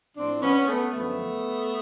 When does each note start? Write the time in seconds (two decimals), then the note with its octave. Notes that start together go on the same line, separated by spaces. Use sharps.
0.16 A2 F3 C4 D4
0.41 B3 C#4
0.67 A3 B3
0.92 F#2 D3 F3 A3 B3